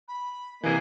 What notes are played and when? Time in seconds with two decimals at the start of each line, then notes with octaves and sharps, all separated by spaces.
0.08 B5
0.63 C3 E3 A#3 D#5 G#5